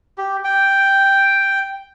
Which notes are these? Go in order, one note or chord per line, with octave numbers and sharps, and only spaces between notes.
G4
G5